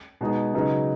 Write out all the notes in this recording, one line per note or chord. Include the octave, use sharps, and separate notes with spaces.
B2 G#3 D#4 G#4
C#3 F#3 D#4 G#4 B4